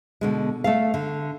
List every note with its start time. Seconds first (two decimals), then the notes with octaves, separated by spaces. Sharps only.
0.21 B2 D3 G#3
0.64 A3 A4 F5
0.94 D3